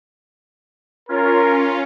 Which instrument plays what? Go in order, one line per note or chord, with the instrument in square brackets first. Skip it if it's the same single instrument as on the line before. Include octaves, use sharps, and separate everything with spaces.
[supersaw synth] C#4 F4 [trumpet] A#4